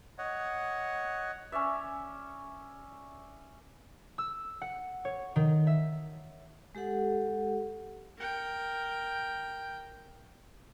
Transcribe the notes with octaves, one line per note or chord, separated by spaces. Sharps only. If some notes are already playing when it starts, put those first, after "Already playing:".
C#5 D#5 F#5
C#4 C#5 D5 E5
E6
F#5
C#5
D#3
E5
G#3 G4 A4 F#5
A#4 G5